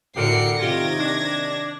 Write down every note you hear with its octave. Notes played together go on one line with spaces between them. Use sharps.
A2 D3 F#4 G4 A#4 C7 C#7
C3 D#3 F4 G4 G#6 A#6
D4